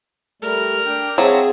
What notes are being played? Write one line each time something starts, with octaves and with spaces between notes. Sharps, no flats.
G3 A3 A#4
D4 G5
F#3 C4 F4 G#4 E5 A5